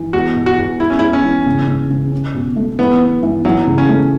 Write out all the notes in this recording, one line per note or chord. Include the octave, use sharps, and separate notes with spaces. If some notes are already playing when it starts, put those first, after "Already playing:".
Already playing: E3
E2 F#4
B2
F#4
E2
E2 E4
C#4
E4
E2
C#4
E3
C#3
C#3
C#3
C#4
B2
A3
E3 B3
B3
E3
E3 F#3
C#3
C#4
A3